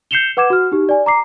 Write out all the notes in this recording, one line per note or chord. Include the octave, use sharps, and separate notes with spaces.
G6 C7 C#7 E7 F7 G7
B4 F#5 D6 G#6 E7
F#4 F6
D#4 G4
D5 G#5
A#5 D6 C7